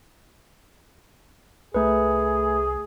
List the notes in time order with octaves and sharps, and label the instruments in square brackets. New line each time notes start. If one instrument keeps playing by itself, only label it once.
[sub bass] C2 [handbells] A3 B4 [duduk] G#4